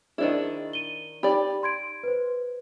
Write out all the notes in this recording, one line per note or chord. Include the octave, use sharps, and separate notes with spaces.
D#3 D4 E4 G#4 C5 D#5
D#7 G7
D#4 G4 D5 B5
C6 G#6 D7
B4 C5